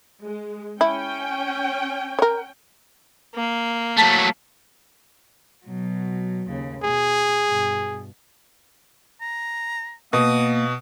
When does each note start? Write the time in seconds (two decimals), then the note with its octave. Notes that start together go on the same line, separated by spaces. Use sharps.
0.24 G#3
0.81 C#4 E4 G5
2.19 A#4 C#5
3.35 A#3
3.97 F#3 A3 A5 B6
5.65 B2 F#3
6.50 D#2 C#3
6.83 B2 G#4
7.47 G2 B2
9.21 A#5
10.13 B2 A#3 D#6